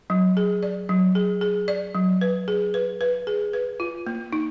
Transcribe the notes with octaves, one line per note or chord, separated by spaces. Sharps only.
F#3
G#4
D5
F#3
G#4
G#4
D5
F#3
B4
G#4
B4
B4
G#4
B4
F4
A#3
D#4